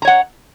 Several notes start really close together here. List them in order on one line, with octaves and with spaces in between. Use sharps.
A#5 C#5 F#5